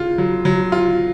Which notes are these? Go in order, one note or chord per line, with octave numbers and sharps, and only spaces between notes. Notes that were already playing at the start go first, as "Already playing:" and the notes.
Already playing: C#3 F4
F#3
F#3
F4